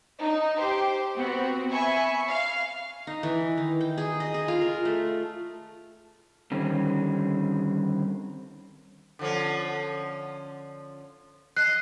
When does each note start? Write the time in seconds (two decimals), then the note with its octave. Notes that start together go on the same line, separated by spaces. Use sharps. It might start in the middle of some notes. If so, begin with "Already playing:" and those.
0.19 D#4
0.57 G4 C5
1.17 B3 C4 F#4
1.71 E5 G#5 B5 C#6
2.29 F5
3.07 D#4
3.23 E3
3.58 D#3
3.81 G5
3.98 G#4
4.20 D#5
4.34 G#4
4.48 F4
4.61 A#4
4.85 A3
6.51 D3 D#3 G3 C4 C#4
9.19 D3 F3 C#4
11.57 D#5 F#6 C7